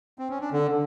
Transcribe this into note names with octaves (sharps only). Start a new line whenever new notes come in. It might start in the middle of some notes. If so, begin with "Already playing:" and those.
C4
C#4
D4
D3